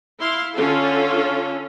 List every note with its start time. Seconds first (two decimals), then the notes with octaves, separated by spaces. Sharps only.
0.19 E4 F5 C6
0.55 D3 C#4 F4 A4